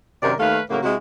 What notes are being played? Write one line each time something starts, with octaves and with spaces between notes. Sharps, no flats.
F#2 C3 D#3 A#4 D5
D#2 A3 B4 F5
A2 C#3 F#3 A#3
C3 G#3 E4 F#4